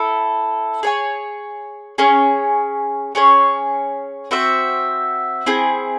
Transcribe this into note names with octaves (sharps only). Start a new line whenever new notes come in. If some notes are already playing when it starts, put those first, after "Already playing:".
Already playing: E4 A4
G#4 C#5 G#5
C#4 G#4 C#5
C#4 G#4 C#5
C4 F#4 C5 E5
C4 E4 G#4